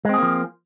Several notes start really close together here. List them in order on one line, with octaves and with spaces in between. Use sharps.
G#3 C4 G#4 A#3 F3